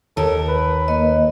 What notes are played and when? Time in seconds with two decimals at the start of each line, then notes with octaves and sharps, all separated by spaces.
0.17 D#2 A4 A#4
0.49 B4
0.88 A#3 D#5